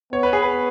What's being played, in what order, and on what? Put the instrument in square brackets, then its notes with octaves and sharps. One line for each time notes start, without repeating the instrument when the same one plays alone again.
[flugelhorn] B3 [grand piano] C#5
[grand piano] B4
G#4
B4